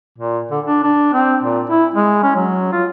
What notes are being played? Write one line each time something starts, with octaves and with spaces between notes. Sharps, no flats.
A#2
D3
D4
D4
C4
A#2
E4
G#3
C#4
F#3
F4